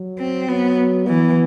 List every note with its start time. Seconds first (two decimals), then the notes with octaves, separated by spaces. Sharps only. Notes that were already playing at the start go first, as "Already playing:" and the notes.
Already playing: F#3
0.19 C4
0.48 F#3 B3
1.07 E3 B3